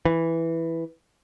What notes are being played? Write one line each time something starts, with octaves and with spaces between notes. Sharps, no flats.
E3